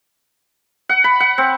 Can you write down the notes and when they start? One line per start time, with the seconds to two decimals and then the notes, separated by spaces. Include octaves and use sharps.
0.89 F#5
1.04 B5
1.20 F#5
1.38 C4